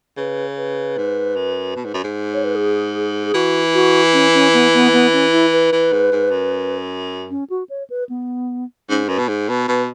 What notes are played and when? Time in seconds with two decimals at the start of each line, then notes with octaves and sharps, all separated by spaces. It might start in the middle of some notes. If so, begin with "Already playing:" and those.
0.17 C#3 B4
0.57 B4
0.97 G#2
1.36 F#2
1.76 B2
1.85 G#2
1.94 F#2
2.04 G#2
2.34 C#5
2.44 B4
2.55 G#4
3.24 G#4
3.34 E3 F#4
3.74 F#4
4.13 C#4
4.34 C#4
4.53 B3
4.74 B3
4.93 B3
5.13 C#4
5.32 E4
5.53 B4
5.72 E3
5.92 G#2
6.12 G#2
6.31 F#2
7.30 C#4
7.50 F#4
7.69 C#5
7.90 B4
8.09 B3
8.89 G#2 C#4
9.09 F#2 B4
9.19 B2
9.28 G#2
9.48 B2 B4
9.68 B2 B4